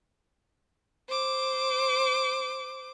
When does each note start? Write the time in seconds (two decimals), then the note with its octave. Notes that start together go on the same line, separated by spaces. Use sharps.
1.09 C5 D6